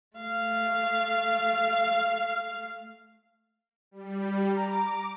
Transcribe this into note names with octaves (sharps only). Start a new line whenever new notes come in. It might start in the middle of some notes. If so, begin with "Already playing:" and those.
A3 F5
G3
A#5 D6